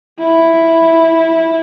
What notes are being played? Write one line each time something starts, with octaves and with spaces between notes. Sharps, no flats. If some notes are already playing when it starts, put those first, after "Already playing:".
E4